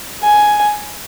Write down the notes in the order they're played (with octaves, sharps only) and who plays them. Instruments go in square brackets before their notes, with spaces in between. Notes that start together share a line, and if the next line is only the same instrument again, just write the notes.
[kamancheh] G#5